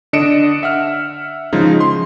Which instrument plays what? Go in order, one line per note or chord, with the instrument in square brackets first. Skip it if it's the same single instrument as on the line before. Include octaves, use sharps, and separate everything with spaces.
[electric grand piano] D3 D4 D#5 C#7 D7 E7
E5 F#5 F6
C#3 F3 G#3 D#4
C6